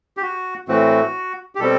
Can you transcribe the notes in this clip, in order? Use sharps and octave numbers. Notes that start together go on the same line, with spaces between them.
G4
F#4
A2 E3 A3 C4 F#4
G4
B2 G3 C4 A4